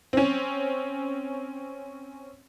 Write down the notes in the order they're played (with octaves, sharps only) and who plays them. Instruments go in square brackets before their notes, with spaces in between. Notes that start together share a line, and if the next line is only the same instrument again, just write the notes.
[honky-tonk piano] C4 C#4